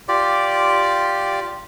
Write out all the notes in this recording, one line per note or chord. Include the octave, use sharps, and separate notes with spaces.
F4 G4 D5